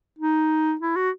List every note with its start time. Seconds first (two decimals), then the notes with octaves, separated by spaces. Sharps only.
0.19 D#4
0.81 E4
0.96 F#4